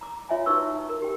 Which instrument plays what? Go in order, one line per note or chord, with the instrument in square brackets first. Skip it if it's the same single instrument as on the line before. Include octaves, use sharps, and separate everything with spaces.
[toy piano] A#5 D6
F4 C#5 E5 F5 G#5 A#5
D#4 F#4 B4 C#6 E6
A#4
G4 G5